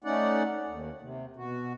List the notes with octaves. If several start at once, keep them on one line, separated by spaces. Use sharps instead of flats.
A3 C#4 D#4 D5 F#5
D#2
C3
B2 F#4